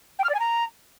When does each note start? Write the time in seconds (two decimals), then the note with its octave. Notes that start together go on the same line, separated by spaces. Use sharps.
0.19 G5
0.24 F6
0.29 D5
0.34 G#5
0.40 A#5